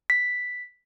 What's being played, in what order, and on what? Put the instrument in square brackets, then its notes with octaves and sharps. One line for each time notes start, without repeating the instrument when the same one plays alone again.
[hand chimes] B6